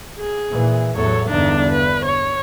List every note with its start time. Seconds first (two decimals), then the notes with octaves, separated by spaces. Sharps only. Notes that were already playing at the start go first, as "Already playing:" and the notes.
0.19 G#4
0.51 A#2 E3
0.95 E2 A2 F#3 A4 C#5
1.29 E2 G2 D3 D4 D#4
1.68 B4
2.05 C#5